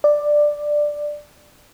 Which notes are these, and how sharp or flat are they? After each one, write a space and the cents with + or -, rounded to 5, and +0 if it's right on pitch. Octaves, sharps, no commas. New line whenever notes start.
D5 +10